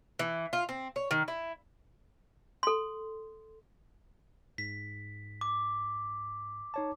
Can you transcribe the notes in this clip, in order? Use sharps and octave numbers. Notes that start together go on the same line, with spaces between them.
E3
F4
C4
C#5
D#3
E4
A4 C6
G#2 B6
D6
D#4 C#5 A5